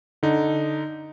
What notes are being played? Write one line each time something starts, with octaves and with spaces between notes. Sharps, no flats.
D3 D#4